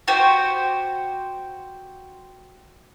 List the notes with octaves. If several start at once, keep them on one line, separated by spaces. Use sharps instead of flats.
F#4 G4 C5